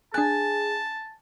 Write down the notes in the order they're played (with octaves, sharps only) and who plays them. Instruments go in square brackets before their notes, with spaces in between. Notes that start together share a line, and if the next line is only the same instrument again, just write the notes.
[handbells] D4 F#6 [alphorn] G#4 [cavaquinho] G#5 [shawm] A5